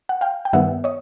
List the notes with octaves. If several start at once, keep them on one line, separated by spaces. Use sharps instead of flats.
F#5
F5 G5
G5
G2 D#3 G3 B3 E5 F#5
C#5 D#5